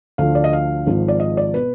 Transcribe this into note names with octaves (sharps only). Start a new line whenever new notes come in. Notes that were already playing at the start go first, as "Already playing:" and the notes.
D2 D3 F3 F5
D5
D#5
F5
G#1 G#2 F3
D5
D#5
D5
B2 B4